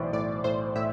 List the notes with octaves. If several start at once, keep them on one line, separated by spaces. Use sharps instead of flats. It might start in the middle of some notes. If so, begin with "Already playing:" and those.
Already playing: B1 A2 E3 C5 D5
A2 D5
A2 C5
A2 E5